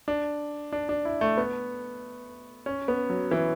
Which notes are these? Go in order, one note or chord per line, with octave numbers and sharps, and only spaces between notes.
D4
D4
D4
E4
A3
B3
C#4
B3
F#3
E3